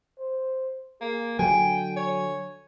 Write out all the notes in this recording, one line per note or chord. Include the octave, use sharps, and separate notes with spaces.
C5
A#3 G#4
D3 F#3 G5 G#5
C#5